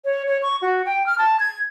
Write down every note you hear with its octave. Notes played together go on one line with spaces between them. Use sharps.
C#5
C#5
C#6
F#4
G5
F6
A5
G#6